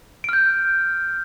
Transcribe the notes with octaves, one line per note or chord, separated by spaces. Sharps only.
F6 G6 D7